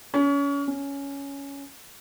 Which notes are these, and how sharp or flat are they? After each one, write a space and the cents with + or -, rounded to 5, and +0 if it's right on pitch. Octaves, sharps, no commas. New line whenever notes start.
C#4 +30
C#4 +10